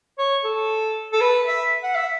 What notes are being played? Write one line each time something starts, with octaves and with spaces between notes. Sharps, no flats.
C#5
A4
A4
B4
E5
F#5
E5